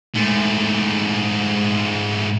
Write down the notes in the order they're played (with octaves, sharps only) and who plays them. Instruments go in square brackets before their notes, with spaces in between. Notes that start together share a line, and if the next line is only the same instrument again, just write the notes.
[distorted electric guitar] G#2 A3